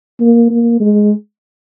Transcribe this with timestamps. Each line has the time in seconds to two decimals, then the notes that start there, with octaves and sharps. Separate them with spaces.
0.20 A#3
0.51 A#3
0.80 G#3